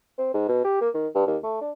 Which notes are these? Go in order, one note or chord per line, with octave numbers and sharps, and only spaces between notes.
C4
G#2
B2
G4
A#3
D#3
G2
D#2
A3
D4